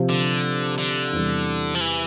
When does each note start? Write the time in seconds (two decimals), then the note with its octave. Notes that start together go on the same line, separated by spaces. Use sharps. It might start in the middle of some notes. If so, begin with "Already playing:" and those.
Already playing: C3 F3 C4
0.09 D3
0.78 D3
1.13 E2 C3 E3 G3
1.75 F3
1.81 E3